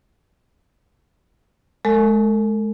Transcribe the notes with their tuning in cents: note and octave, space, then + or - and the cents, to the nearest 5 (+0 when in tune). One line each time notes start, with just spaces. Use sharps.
G#3 +35 A4 +45